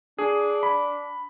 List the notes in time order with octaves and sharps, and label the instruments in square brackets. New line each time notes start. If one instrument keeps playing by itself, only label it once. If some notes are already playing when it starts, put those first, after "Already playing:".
[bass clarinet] D4 [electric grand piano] G#4
[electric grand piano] B5